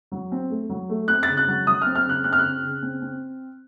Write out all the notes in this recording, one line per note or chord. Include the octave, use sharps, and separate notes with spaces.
F#3
C4
A3
F#3
A3
C4 F#6
A6
C#3
F#6
F#3
F#3 D#6
C4 F6
F6
C#3 F#6
C4 F#6
F6
C#3 F#6
C#3
C4
C4